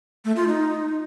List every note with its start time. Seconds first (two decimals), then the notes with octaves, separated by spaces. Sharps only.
0.25 A3
0.36 F4
0.48 D#4